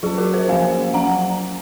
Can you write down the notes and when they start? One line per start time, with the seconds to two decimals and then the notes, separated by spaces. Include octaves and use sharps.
0.03 F#3 C#4 F4 G#4
0.18 F#4 A#4
0.33 G#4 C5
0.48 F3 A#3 C#4 F5 G#5
0.94 F#3 C#4 F#5 A#5